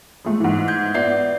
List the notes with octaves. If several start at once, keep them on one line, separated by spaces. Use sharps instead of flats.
G#3 A3
G#2 E3
G6 G#6
B3 D5 E5 C7